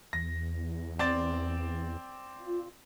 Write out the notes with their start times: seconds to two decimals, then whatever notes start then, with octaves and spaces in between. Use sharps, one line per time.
0.13 E2 A#6
0.99 C4 D5 A6
2.39 F4